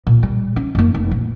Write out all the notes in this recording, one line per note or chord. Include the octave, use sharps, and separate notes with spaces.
A#2
G3
C#4
F#2 A#3
F1
A#2